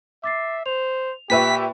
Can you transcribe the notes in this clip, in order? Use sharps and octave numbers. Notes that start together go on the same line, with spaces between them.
E5 D6 A6 C7
C5 F7
A#2 G4 B4 E5 G5 B5 C#6 B6